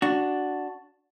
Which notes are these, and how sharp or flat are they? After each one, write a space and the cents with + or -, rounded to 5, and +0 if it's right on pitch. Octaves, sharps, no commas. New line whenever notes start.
D4 +0 F#4 +0